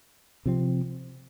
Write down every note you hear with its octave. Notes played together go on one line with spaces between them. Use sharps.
C3 F3 C4